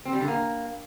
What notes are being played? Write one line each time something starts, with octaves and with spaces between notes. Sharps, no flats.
C4
G3
D3
A#3